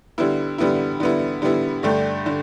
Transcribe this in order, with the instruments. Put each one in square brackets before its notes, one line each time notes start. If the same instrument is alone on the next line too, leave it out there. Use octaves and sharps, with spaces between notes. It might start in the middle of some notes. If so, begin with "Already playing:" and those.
[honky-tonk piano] D3 G3 B3 E4
D3 G3 B3 E4
D3 G3 B3 E4
D3 G3 B3 E4
G2 D3 A3 D4 G4
D3